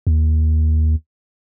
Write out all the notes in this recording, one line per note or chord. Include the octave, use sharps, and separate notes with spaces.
D#2